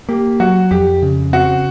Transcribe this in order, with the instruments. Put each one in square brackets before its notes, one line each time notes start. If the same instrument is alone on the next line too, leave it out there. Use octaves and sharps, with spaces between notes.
[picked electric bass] A#3 [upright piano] G4
[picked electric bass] F#3 [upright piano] F#4
[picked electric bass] F2 [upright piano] G4
[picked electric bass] C#3
[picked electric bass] C4 [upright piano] F#4